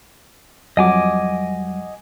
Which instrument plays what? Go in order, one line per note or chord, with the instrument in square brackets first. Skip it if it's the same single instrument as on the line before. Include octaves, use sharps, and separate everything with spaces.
[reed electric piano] F2 F#3 G3 [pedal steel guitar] D#5 G#5 D6 [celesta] F#5